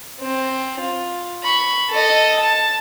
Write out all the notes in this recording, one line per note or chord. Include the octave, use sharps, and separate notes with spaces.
C4
F4
B5 C#6
A4 D#5
A5